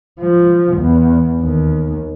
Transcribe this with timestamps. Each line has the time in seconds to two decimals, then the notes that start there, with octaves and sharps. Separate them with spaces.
0.20 F3
0.77 E2
1.41 D#2